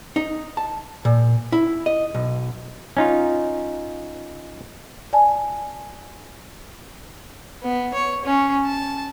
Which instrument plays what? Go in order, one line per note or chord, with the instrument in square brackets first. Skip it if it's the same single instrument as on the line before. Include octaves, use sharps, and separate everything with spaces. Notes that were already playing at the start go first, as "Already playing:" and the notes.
[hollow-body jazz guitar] D#4
A5
A#2
E4
D#5
B1
[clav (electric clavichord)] C#4 D#4 F4
[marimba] D5 G#5 A5
[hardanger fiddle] B3
C#5
C#4
A5